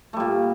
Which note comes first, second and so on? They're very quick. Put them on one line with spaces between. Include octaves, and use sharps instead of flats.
A3 G3 A#2